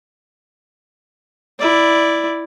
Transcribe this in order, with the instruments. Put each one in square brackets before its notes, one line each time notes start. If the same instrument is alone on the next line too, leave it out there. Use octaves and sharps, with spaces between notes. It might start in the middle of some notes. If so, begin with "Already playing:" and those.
[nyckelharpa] E4 D5